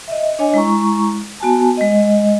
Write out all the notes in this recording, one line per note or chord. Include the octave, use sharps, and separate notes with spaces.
D#5 E5
D4 C#5 D#5 G#5
G#3 E4 A#5 C#6
B3 F#4 G#5 A5
G#3 D#5